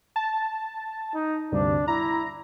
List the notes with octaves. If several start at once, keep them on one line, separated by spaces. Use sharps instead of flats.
A5
D#4
D2 G2 C3 D4
E4 A#5